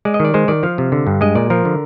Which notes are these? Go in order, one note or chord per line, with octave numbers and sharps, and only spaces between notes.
G#3 D5
D#5
D#3 D5
G#3 C5
D#3 D5
F3 F5
C3
D3
G2
G#3 D#5
A#2 D5
F3 A#4
D3